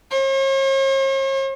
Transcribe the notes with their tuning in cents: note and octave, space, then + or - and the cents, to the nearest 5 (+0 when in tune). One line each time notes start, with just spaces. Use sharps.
C#5 -45